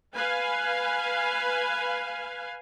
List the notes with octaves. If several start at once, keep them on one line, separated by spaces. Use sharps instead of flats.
B4 F5 G#5